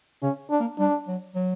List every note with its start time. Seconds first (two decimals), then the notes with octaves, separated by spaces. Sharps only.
0.23 C#3 C#4
0.50 D4
0.60 A#3
0.79 G3 D4
1.08 F#3
1.35 F#3